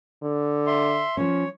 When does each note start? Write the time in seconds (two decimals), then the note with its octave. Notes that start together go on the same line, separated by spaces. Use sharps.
0.23 D3
0.67 E5 C6
1.17 F3 C#4 C#5